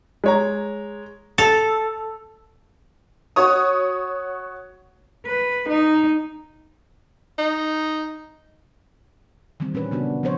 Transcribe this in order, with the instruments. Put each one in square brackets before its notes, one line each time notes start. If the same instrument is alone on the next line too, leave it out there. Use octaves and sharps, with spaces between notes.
[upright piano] G#3 C#5 A#5
[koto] A4 [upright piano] F7
[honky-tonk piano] F#4 C#5 C#6 D#6
[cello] B4
D#4
[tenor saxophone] D#4
[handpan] D#3 E3 G3 C4
A#2 C#4 D4 B4
C#3 B3 D4 F#4
F3 C4 C5 C#5